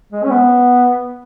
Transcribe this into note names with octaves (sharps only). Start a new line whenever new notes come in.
G#3
C#4
B3